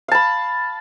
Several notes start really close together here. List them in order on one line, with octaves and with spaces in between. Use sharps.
F5 A5 B5